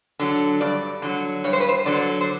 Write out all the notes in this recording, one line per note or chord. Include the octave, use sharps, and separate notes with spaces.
D3 F#3
G2 D5
D3 F#3
G2 C#5
C5
B4
C5
D3 F#3 D5
C5